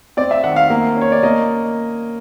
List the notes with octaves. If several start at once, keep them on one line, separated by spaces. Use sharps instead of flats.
C4 D5
E5
D#3 F#5
F5
A#3
C#4 C#5
D5
A#3 D#5